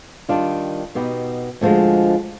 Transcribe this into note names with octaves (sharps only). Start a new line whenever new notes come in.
D#3 G3 D4 F4
B2 B3 D#4 G4
D2 D3 F3 G#3